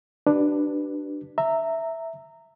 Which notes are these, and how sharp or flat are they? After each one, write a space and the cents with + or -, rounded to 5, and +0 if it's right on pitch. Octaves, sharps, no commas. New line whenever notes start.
D4 +10 G4 -45 B4 +0
E5 +0 A#5 -20